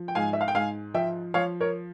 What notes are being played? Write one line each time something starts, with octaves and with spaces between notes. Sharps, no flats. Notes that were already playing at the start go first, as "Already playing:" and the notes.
Already playing: F3
G5
G#2 F5 G#5
E5
F5
G5
G#2 F5 G#5
F3 E5 G5
F3 C#5 F5
A#4 C#5